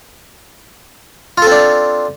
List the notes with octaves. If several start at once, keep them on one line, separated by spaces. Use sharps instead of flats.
C4 D4 F4 A4